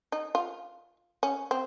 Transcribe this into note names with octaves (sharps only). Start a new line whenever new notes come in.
D#4
F4
C#4
C4